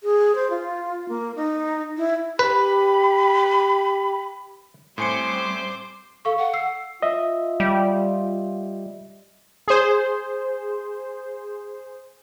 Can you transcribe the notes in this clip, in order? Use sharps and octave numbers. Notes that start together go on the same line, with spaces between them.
G#4
C5
F4
A#3
D#4
E4
G4 B4 B5
A2 G3 C4 C5 G#5 C6 D6 C#7
A4 F5 C#6
F#5
E6 C7
F4 D#5 E5
G3
G#4 C5